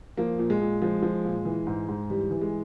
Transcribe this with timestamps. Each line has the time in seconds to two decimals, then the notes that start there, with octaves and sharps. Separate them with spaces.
0.17 F3 A#3
0.39 A#2
0.50 G#3
0.61 A#2
0.82 F3 G#3
1.02 F3
1.25 A#2
1.45 E3
1.67 G#2
1.88 G#2
2.10 E3 G3
2.31 E3
2.41 G#3